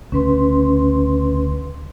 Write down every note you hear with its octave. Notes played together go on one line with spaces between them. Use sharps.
D2 C#3 C#4 B4 C6